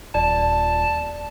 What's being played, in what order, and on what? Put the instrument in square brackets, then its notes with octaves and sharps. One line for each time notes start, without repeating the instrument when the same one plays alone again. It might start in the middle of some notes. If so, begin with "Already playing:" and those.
[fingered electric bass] D#1 [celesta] D5 [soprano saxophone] A5